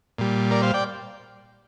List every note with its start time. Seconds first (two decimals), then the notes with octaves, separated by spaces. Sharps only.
0.18 A#2 G3
0.51 A#4 D5
0.62 C5 F5
0.74 D5 G5